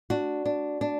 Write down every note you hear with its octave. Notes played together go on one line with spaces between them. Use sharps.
D4 F#4
D4
D4